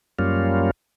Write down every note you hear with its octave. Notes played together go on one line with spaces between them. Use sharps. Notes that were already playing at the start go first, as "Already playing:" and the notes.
F#2 G3 A#3 C#4 F4